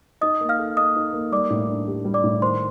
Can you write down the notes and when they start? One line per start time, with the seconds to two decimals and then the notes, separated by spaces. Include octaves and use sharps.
0.21 D#4 D#5 D#6
0.41 A#3
0.49 F5 F6
0.59 A4
0.77 A#3 D#5 D#6
0.96 D#4
1.13 A#3
1.32 G3 D5 D6
1.50 A2
1.68 D4
1.87 G4
2.05 G3
2.14 D5 D6
2.24 A2
2.42 D#3 C5 C6